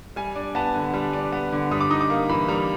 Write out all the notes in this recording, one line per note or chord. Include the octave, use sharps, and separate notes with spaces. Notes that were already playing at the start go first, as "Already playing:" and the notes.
G3 G#5
D4
B3 A5
D3
G3
D4
B3
D3
G3 D#6
D6
D#4 D#6
D6
A#3
E3 B5
G3 A#5